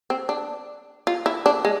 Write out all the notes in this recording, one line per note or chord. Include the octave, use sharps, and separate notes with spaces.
C4
D4
F4
E4
D4
G#3